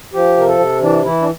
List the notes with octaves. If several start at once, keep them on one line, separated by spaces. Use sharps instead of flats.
F3 G4
C3 A#4
A4
C3
E3 D4
E3 E4
D4